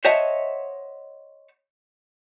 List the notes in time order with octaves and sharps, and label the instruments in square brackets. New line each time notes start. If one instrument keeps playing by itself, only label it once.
[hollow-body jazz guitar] C5 C#5 D#5 E5 F#5 A5